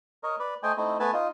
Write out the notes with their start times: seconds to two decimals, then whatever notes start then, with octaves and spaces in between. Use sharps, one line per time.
0.23 A#4 C#5 D#5
0.39 B4 D5
0.63 A3 C5 D#5 G5 G#5
0.77 A3 C4 D#4 E4
1.00 A3 B3 B4 G#5 A5
1.13 D#4 F4